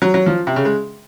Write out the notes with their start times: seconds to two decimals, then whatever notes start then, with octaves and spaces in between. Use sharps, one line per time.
0.02 F#3
0.14 F#3
0.26 F3
0.47 C3
0.56 C#3
0.65 G#3